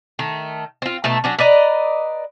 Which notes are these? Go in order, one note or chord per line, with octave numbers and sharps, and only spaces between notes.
D#3 A3
C4 F4
B2 A3 D#4 A5
F#3 C#4 D4
B4 D5 D#5 A#5